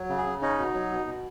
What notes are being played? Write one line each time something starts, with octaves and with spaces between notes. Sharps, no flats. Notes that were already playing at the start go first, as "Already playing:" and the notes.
Already playing: F#3
C#3
G#4
C#3
C#4 D#4
B2
F#3
B2
B2